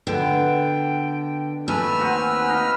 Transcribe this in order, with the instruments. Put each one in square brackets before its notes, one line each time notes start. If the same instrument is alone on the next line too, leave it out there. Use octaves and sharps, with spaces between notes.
[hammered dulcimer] B2 [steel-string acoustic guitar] D3 [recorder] G5
[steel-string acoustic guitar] D#2 [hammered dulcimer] A3 [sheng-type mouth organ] B4 E6 F6 [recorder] G#5
[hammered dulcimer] C4 D#4 F#4
D#4 D#5 F5